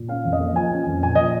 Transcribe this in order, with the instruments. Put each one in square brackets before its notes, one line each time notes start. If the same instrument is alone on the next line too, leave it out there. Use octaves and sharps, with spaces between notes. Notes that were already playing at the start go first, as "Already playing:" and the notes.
Already playing: [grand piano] A#2
C#4 F5
F2
D#5
A#3
F3 G#5
C#4
F2
A#2 G#5
A#2 D#5